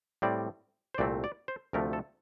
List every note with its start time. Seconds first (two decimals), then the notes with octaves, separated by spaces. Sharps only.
0.22 A2 G3 C4 D5
0.94 C5
0.98 C2 A#2 A3 C4 D5
1.24 D5
1.48 C5
1.73 D2 C3 F3 A3 A#4
1.93 A4